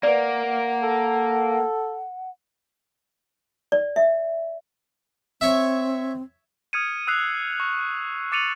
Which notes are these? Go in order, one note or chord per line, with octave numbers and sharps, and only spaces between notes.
A#3 B4 D5 F#5
A4
D5
E5
C4 C#5 E5
D#6 F6 G#6 C#7 D#7
D#6 E6 F#6 C7 D#7 F7
C#6
D6 A6 C#7 D#7 F7 F#7